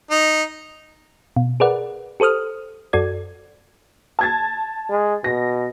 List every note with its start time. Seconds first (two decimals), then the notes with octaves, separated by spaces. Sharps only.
0.11 D#4
1.36 B2
1.60 G#4 A#4 B4 D5 F#5
2.20 G4 A4 C5 D#6 F6
2.93 F#2 F#4 A4 D5 G#6
4.19 A5 G#6 A6
4.90 G#3
5.24 B2 A#6